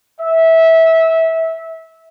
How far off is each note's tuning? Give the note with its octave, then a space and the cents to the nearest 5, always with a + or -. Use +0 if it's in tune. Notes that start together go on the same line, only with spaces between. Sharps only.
E5 -20